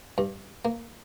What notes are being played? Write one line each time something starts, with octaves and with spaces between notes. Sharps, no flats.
G2
A#3